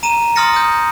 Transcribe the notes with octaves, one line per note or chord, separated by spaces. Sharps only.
A#5 D#7 E7
C6 D#6 F6 A6 A#6 C#7
D#6 G6